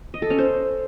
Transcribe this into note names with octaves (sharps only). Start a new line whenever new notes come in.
D#5
A4
C#4
C5